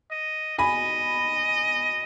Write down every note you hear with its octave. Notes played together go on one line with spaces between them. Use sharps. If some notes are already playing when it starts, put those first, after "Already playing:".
D#5
D#5 G#5 B5